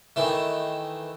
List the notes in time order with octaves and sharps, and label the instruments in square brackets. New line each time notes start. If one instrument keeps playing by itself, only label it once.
[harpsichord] D#3 E3 A3